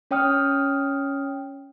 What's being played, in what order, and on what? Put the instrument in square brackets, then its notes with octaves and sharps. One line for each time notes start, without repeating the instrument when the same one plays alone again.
[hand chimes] C#4 C#5 G5 D#6 F6